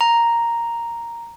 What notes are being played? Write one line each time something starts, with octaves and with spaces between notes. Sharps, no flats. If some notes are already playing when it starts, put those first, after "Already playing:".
A#5